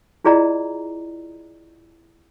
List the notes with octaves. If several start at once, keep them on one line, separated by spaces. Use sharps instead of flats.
E4 F4 G#4 D5 D#5 A#5